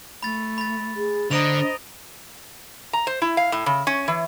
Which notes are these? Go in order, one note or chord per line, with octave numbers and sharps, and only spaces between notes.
A3 B5 A6
B5 A6
G#4
D3 C5 D#5 A#5 D7 F7
A#5
C5
E4
F5
A2
C#3
C#4
E3